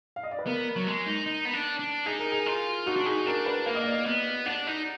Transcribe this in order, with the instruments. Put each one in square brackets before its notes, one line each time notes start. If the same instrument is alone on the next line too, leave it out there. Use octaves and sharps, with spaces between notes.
[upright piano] F5
D#5
D5
B4
[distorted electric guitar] B3 [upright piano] A#4
[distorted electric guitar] F#3
G#3
D#4
D#4
B3
D4
D4
[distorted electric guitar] D#4 [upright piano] G#4
[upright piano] A#4
G#4
[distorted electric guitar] F4
[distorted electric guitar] D#4 [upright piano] F#4
[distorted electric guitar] D4
[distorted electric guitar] D#4 [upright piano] G#4
[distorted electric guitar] D4 [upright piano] A#4
[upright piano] B4
[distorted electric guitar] A#3 [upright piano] F5
[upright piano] D#5
D5
D#5
[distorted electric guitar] B3
[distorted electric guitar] D4 [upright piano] F#5
[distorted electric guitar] D#4